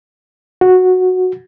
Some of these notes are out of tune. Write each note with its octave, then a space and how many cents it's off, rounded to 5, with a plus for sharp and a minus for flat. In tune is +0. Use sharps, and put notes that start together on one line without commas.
F#4 -10